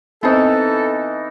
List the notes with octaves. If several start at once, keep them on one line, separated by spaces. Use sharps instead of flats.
E3 B3 C4 D#4 A4 C5